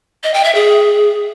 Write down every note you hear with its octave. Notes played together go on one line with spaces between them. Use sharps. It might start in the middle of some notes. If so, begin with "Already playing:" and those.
D#5
G5
E5
G#4